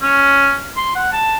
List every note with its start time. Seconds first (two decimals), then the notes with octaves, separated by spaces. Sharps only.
0.03 C#4
0.77 C6
0.95 F#5
1.13 A5